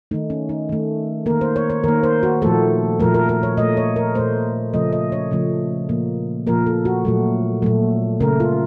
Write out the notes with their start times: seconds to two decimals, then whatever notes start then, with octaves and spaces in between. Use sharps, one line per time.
0.11 A3 D#4
0.14 D#3
0.30 C#4
0.49 D#4
0.69 D#3 A3
1.26 A#3 A#4
1.30 D#3
1.41 C5
1.56 C#5
1.70 C#5
1.84 D#3 A#3 A#4
2.03 C5
2.23 F#4
2.42 A#2 F3 A3 A4
3.00 A#2 F3 A3 A#4
3.14 A#4
3.29 A#4
3.43 C#5
3.57 A#2 A3 D#5
3.77 C#5
3.96 A#4
4.15 A#2 A3 C5
4.74 C#3 F3 A3 D#5
4.93 D#5
5.12 C#5
5.31 C#3 F3 A3
5.89 A#2 F3 A#3
6.47 A#2 F3 A#3 A#4
6.66 A4
6.85 F#4
7.05 A#2 F#3 A3
7.62 A#2 F#3 A3
8.20 C#3 A3 A#4
8.40 F4